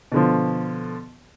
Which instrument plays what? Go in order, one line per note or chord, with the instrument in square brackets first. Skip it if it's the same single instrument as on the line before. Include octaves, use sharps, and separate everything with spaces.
[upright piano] B2 D3 F3